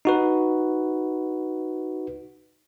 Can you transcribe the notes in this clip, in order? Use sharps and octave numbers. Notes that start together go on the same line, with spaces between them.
D#4 F#4 B4